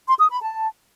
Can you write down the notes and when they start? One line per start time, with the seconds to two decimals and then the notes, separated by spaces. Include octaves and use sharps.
0.07 C6
0.19 D#6
0.30 B5
0.42 A5